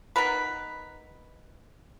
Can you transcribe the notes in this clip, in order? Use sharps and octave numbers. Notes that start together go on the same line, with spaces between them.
B3 D#4 A#4 B4